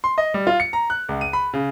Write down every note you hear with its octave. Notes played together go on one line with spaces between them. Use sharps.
C6
D#5
G3
F4
C#7
A#5
F#6
C#2
D#7
B5
C#3